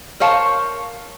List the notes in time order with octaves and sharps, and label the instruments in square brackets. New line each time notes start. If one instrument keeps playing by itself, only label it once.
[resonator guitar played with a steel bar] A#4 C5 C#5 F5 A5